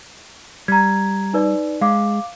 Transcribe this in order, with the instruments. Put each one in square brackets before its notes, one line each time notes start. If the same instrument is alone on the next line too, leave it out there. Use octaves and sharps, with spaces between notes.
[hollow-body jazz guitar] G3 [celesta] A#5 G#6
[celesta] D#4 B4 D5
[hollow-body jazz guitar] G#3 [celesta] F5 D6